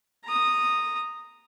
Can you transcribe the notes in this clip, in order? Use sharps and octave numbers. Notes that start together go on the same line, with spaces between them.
A#5 D#6